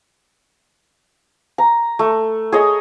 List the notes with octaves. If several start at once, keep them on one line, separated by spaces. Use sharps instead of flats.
A#5
A3
G#4 C#5 D#5